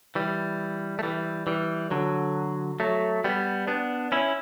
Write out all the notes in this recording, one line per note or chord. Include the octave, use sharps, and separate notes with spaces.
E3 G3
A3
E3 G3
E3 G3
D3 F#3
F#3 A3
G3 B3
B3 D4
C#4 E4